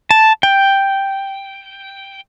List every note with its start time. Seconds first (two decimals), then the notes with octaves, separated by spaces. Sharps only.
0.11 A5
0.43 G5